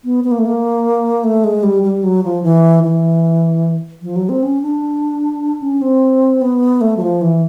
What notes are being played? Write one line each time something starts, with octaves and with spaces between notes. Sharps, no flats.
B3
B3
A#3
A3
A#3
A3
G#3
G3
G3
F#3
F3
E3
E3
F3
F#3
C4
C#4
D4
C#4
C4
B3
A3
F#3
F3
E3